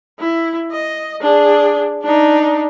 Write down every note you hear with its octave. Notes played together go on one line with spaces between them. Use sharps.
E4
D#5
D4 G#4
D4 D#4